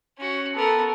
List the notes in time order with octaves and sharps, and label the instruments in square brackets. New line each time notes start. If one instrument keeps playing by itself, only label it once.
[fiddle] C#4 F#4
[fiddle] B3 A#4 [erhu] A4